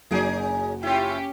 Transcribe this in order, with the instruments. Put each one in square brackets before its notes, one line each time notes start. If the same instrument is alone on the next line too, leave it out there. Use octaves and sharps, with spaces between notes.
[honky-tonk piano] F#1 F#4 D7 [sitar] C#4 D#4 G#4
[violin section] C#4 G4 [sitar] E4 F4